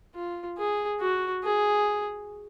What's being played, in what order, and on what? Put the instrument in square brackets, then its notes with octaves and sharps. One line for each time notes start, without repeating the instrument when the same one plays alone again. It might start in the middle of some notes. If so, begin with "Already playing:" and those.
[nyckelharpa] F4
G#4
F#4
G#4